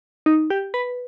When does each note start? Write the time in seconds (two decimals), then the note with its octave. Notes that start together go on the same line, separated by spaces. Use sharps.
0.26 D#4
0.50 G4
0.74 B4